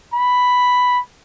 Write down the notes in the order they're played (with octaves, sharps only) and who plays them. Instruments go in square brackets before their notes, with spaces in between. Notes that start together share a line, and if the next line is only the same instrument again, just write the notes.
[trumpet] B5